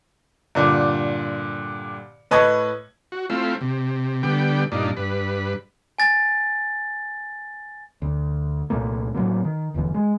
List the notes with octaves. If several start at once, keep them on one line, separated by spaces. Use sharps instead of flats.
G2 A#2 D3
A2 B4 D#5 A5 C#6 G#6
F#4
A3 C4 E4 F4
C3
D3 G3 B3 G5
G2 A#2 D4 D#4
G2 B4
G#5 A6
D2
C2 A#2 A3 A#3
A2 C#3 F#3 A#3
D#3
D1 G1 D#2 E3
G#3